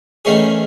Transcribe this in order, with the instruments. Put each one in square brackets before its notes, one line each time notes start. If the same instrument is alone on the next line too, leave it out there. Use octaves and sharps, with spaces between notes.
[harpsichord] E2 D#3 A3 C#4 G#4